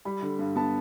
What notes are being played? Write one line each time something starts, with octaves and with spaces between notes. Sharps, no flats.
G3 B5
D3
G2
B3 A5